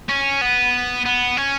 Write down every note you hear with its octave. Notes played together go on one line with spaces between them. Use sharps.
C#4
B3
B3
C#4